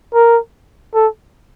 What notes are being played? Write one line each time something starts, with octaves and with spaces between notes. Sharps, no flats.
A#4
A4